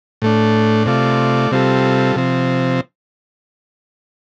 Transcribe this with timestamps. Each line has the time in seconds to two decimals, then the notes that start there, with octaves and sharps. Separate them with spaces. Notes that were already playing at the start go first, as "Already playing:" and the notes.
0.22 A2 A3 D4
0.86 C3 A3 F4 D5
1.51 C3 G3 C4 F4 A4
2.16 C3 F3 C4